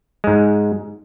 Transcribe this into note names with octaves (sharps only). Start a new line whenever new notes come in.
G#2 G#3